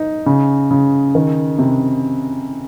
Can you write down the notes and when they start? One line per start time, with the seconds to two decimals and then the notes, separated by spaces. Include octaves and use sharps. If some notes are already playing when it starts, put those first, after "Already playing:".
Already playing: D#4
0.26 C#3
0.71 C#3
1.15 D#3
1.58 C3